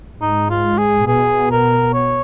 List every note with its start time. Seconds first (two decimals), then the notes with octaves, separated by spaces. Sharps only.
0.21 G#2 G#3 D#4
0.50 F4
0.78 G#4
1.07 B2 B3 G#4
1.51 A#4
1.93 C#5